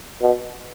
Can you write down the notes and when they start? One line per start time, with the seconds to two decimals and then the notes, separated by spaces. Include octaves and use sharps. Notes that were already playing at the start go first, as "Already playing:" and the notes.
0.21 B2